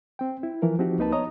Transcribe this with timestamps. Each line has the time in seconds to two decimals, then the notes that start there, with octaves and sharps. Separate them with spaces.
0.19 C4 G5
0.43 E4
0.62 E3 F3 A#4
0.79 F3 C4 D#4 F#4 G4
0.98 C#2 A#3 D#4 B4 A5
1.12 B3 C#5 D#5 A#5 D#6